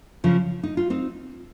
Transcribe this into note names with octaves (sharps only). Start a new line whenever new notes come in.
C#3 F3
D#4
F4
C4 D#4